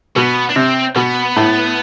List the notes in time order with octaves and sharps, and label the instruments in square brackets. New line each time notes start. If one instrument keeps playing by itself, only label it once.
[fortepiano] B2 [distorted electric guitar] B3
[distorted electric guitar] D4
[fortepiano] C3 [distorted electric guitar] C4
[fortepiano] B2 [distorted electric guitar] B3
[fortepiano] A2